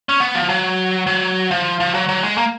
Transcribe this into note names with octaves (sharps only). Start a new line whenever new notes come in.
C#4
B3
F3
F#3
F#3
F3
F3
F#3
F#3
G#3
A#3